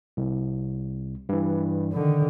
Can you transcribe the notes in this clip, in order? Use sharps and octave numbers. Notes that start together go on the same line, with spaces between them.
C2
G2 E3
D3 D#3